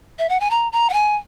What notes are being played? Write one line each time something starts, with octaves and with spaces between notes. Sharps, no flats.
E5
F#5
G#5
A#5
A#5
F#5
G#5